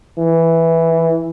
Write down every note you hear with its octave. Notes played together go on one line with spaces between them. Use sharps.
E3